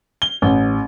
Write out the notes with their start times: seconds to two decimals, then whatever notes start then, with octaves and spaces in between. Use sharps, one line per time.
0.22 G7
0.42 A1